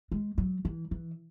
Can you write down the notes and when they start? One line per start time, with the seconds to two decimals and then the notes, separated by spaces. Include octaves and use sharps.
0.12 G#3
0.38 F#3
0.65 E3
0.91 E3